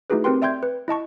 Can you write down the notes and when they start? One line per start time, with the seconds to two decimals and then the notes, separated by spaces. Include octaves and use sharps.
0.10 A3 D#4 E4 F#4 G#4 B4
0.24 C4 G4 A#4 B4 G5 C6
0.42 D5 E5 G5 C6 G6 G#6
0.63 B4
0.88 E4 D#5 A5 C#6